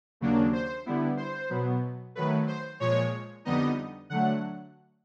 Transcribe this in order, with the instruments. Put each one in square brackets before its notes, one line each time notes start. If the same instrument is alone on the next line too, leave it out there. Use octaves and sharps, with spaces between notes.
[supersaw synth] D#2 C#3 F#3 A#3 D4
C5
D3 G3 B3 E4
C5
B2 F#3 B3
D#3 F#3 A3 B4
C5
A#2 F3 G#3 C#5
F2 D3 G3 B3 D#4 D#5
D3 F#3 A3 F#5